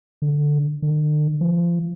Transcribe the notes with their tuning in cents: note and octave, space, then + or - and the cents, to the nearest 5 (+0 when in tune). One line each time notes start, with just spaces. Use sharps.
D3 +5
D3 +45
F3 -25